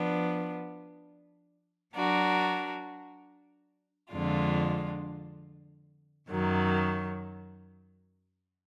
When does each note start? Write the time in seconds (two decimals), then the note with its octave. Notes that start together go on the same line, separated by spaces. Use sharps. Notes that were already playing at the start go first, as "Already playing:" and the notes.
Already playing: F3 B3 D4
1.95 F#3 D4 F#4 A#4
4.12 F2 D3 G#3 D4 F4
6.30 F#2 D#3 F#3